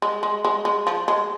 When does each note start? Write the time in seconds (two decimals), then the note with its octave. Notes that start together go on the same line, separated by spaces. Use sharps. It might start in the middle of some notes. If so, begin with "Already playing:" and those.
0.02 G#3
0.23 G#3
0.45 G#3
0.65 G#3
0.87 F3
1.08 G#3